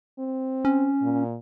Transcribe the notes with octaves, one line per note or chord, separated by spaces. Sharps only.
C4
C#4
A#2